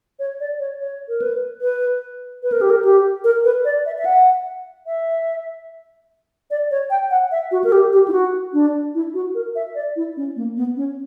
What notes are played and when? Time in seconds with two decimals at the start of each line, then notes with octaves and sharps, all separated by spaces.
0.19 C#5
0.40 D5
0.59 C#5
0.80 C#5
1.09 A#4
1.22 B4
1.61 B4
2.43 B4
2.52 A#4
2.61 G4
2.70 A#4
2.84 G4
3.24 A#4
3.44 B4
3.65 D5
3.86 E5
3.98 E5
4.05 F#5
4.87 E5
6.51 D5
6.71 C#5
6.90 G5
7.11 F#5
7.32 E5
7.52 F#4
7.64 A#4
7.72 G4
7.93 G4
8.08 E4
8.12 F#4
8.53 D4
8.95 E4
9.14 F#4
9.35 A#4
9.56 E5
9.75 D5
9.96 E4
10.17 C#4
10.36 A#3
10.56 B3
10.77 C#4